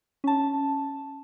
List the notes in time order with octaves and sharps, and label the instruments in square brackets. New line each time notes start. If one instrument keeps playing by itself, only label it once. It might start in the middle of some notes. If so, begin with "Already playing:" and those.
[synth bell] C#4 A5